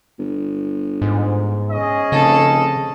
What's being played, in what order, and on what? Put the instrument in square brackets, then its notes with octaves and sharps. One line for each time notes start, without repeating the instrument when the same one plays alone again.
[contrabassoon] G1
[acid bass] G#2
[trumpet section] C#4 G#4 D#5
[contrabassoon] F1 [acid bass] C#3 [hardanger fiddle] A4